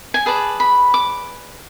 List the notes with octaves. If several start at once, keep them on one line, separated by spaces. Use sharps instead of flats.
G#5
G#4 B4 D5 A5
B5
D6